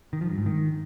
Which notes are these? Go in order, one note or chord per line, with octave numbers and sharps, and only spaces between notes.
D#3
F3
G2
G#2
D#3